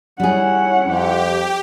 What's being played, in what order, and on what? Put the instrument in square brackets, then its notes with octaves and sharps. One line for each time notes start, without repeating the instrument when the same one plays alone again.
[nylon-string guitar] G3 G#4 [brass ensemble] C#4 [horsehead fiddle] E4 F#5
[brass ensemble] F2 [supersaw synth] G4